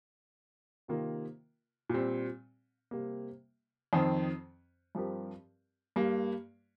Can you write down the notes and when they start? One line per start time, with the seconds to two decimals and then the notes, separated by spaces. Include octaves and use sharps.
0.88 C3 D#3 A#3 F4 A#4
1.89 A#2 G3 C4
2.91 C3 G3 A#3
3.93 F2 D#3 C4
4.95 G2 F3 C4 G4 A#4
5.96 G2 G3 A#3